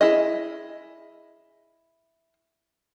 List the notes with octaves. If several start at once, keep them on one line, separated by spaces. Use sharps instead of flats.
E4 G#4 D#5